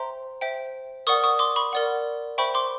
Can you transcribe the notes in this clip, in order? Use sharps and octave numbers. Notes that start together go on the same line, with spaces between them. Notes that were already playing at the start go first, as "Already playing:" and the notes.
Already playing: C5 E5 G5 A#5 C6
C5 E5 G5
A#4 D5 F#5 C#6 D#6
C#6 D#6
C6 D6
B5 C#6
A#4 D5 F#5
C5 E5 G5 B5 C#6
C6 D6